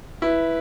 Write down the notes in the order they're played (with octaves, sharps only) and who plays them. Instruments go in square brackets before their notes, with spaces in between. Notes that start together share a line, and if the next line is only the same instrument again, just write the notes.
[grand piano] E4 [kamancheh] B4